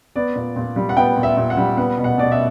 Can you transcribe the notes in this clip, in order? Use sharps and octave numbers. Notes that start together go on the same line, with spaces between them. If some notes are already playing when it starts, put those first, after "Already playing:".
B3 D5
A#2
A#2
G3
F#5
B3 G5
A#2
E5
A#2
F#5
G3
B3 F#5
B2
F#5
B2 D5
E5